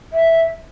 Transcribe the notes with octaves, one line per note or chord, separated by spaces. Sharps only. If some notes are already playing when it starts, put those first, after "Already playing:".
E5